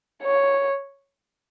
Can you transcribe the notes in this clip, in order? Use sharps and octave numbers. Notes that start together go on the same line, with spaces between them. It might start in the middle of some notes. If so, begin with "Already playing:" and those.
C#5